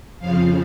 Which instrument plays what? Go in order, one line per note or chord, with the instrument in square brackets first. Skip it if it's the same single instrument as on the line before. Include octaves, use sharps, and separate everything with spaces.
[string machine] F2 C#3 F3 F5